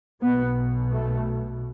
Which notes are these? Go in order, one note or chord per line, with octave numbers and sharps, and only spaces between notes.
B1 B2 B3
A3